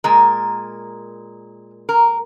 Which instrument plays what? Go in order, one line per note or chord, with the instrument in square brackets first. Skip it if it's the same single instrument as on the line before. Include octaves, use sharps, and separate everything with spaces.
[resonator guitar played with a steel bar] A#2 G#3 A#4
A#4